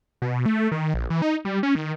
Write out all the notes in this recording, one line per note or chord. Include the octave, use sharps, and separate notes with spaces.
B2
A3
D#3
A#1
E3
D#4
G3
C#4
D#3